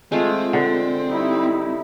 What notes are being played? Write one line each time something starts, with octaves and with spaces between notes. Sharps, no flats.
G#3 A3 C4 F4
D3
G3 D#4 E4